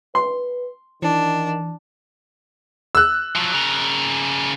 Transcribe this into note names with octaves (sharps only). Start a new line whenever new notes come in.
B4 C6
D#3 E3 D4
E6 F#6
F3 F#3
C#3 A#4